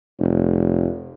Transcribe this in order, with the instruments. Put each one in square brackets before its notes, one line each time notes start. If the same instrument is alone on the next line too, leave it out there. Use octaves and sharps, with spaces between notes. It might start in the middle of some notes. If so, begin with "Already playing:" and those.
[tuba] F1